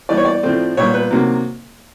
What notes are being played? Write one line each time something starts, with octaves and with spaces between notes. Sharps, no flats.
E3 G3 B3 D5
C#5
D5
A2 F3 A3 C4
A#2 G3 B3 C#5
B4
C3 D#3 F#3 A#3